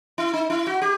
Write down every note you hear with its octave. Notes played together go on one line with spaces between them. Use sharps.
E4
D#4
E4
F#4
G4